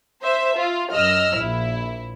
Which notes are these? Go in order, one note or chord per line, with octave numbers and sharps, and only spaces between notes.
C5 E5
F4
F#2 D#5 E6 F6
A#1 E4